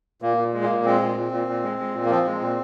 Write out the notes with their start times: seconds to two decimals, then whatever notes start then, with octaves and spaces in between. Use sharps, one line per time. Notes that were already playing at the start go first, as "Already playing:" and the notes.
0.22 A#2 A#3
0.37 A#2
0.54 G#3
0.64 A#3
0.69 A#2
0.84 G#3 C4
1.01 A#2
1.16 A#2
1.32 A#2
1.48 A#2
1.63 G#3
1.79 G#3
1.95 A#2
2.05 A#3
2.10 F3 C4
2.26 G#3
2.42 A#2